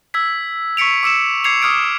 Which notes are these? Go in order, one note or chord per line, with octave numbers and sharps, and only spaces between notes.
E6 G#6 B6
C#6 B6 C#7 D7 F7
D6 E6 C#7 E7
D6 G#6 C7 C#7 F7
D6 D#6 F6 G#6 D7